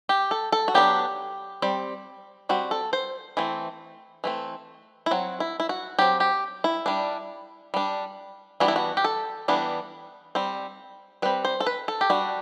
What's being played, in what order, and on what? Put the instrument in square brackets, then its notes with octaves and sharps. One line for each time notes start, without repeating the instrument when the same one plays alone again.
[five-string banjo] G4
A4
A4
F#4
F#3 B3 D4 G4
G3 C4
G3 C4 F#4
A4
C5
E3 A3 C4
E3 A3 C4
E4
F#3 C4 F#4
E4
E4
F#4
F#3 C4 G4
G4
E4
G3 D4
G3 D4
E3 G3 B3 D4 F#4
E4
F#4
G4
A4
E3 G3 B3 D4
G3 C4
G3 C4 B4
C5
A4
B4
A4
G4
G3 D4 F#4